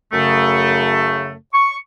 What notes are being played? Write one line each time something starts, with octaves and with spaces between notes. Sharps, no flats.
F#2 C#3 A3
C#6